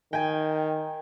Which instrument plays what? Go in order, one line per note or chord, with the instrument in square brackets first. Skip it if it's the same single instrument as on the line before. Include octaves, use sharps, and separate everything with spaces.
[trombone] D#3 [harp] G5 G#5